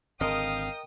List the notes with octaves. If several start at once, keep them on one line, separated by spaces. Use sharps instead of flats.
G#1 D3 C4 A#4 D#5 F5 G5 D#6